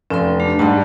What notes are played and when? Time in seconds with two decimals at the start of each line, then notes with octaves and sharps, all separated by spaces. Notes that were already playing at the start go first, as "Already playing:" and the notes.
0.10 F1 C#4 G5 C6
0.40 A3 D4 G4
0.59 G#2 G3 A5